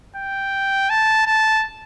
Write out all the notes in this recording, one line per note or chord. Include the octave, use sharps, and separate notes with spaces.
G5
A5
A5